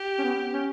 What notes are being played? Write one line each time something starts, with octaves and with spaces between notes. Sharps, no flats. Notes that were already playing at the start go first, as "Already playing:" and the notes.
Already playing: G4
C#4
B3
C#4